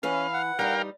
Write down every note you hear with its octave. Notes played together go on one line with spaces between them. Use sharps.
E3 C#4 B4 F5
F#5
G3 D#4 A#4 F5 G5